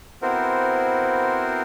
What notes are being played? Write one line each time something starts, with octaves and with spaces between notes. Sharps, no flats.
B3 C4 E4 F#4 A#4 C5